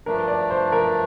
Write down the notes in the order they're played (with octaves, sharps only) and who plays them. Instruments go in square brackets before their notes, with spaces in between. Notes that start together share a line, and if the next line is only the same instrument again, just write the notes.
[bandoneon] G2 F3 A3 D4 [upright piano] A#4
[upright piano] D5
C5
A#4